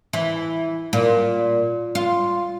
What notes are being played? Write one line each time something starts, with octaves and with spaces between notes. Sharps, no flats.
E3
A#2
F4